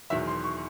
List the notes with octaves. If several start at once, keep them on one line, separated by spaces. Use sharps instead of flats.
E1 E2 D#3 F#3 E5
C6
C#6